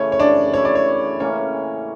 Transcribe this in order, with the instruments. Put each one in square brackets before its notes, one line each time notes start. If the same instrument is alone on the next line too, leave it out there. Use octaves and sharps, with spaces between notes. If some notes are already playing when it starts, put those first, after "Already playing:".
Already playing: [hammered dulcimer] C#3 E3 A3 [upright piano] C#5
[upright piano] C#5
D4 D5
[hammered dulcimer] E3 A3 E4 [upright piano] C#5
[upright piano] D5
C#5
[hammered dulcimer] A2 E3 A#3 C#4 [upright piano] C#5